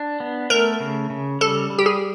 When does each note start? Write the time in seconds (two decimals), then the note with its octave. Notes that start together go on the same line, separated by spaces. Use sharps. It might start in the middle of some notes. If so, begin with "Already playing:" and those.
Already playing: D4
0.20 B3
0.50 A3 A#4
0.80 C#3
1.10 C#3
1.41 G3 A4
1.70 G3
1.79 G4
1.86 G#4